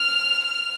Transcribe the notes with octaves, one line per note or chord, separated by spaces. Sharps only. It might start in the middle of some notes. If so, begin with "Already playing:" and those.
Already playing: F6
F6